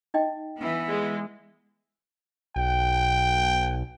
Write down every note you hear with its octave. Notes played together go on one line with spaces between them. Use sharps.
D#4 D#5 G5
E3 B3
G#3
B1 G5